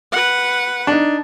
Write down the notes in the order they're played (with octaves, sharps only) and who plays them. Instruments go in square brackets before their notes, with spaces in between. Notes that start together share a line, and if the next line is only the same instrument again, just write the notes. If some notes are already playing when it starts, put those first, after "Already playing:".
[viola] B4 F#5
[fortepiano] D4 D#4